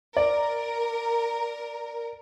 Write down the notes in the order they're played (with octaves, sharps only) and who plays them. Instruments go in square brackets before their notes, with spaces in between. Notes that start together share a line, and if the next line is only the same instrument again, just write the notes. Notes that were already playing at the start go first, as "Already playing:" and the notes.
[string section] A#4 [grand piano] D5